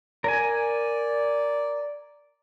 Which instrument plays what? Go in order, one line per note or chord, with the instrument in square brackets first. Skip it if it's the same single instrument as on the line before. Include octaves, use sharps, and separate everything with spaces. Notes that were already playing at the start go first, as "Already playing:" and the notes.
[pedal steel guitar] A#4 G#5 [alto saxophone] D5